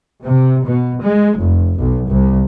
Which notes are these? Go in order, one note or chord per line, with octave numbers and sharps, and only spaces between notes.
C3
B2
G#3
F1
B1
C2